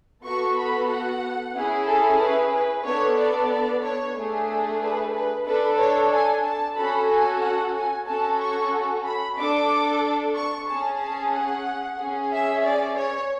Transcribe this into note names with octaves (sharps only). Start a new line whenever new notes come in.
B3 F#4 A4 C#6
B5
F#5
C#4 E4 G#4
A4
B4
B4
B3 D4 A4 C#5
D5
D5
C#5
A3 D4 G#4
A4
B4
B4
D4 A4 B4
C#5
G#5
A5
C#4 F#4 A4 B5
G#5
F#5
G#5
C#4 F#4 A4 A5
C#6
B5
D4 A4 D6
C#6
C#4 G#4 A5
A5
F#5
C#4 G#4
E5
D5
C#5